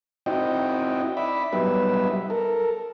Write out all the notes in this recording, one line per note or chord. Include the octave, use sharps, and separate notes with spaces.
C4 D#4 E4 F#4 D#5 G5
D5 E5 B5
F#3 G3 B3 D#4 B4 E5
A4 A#4